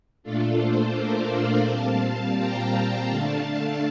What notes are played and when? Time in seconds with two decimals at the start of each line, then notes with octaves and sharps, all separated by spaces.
0.23 A#2 A3 D4 F4 A4
0.58 A4 C5
0.94 A#4 D5
1.29 D5 F5
1.65 A#2 G3 C4 F5 A5
2.01 F5 A5
2.37 G5 A#5
2.72 F5 A5
3.09 D3 A3 D4
3.43 F5 A5